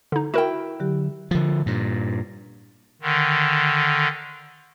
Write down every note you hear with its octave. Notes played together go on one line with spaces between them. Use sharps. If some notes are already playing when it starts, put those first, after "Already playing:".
D3 D#4
E4 F#4 A#4 G5
D3 F#3 G4
D3 F3
G2 A#2
D3 D#3